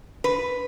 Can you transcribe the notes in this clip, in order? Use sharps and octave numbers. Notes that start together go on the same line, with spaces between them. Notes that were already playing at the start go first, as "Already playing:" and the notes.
B4